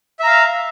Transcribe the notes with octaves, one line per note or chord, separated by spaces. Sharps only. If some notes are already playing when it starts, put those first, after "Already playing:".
E5 F5 A#5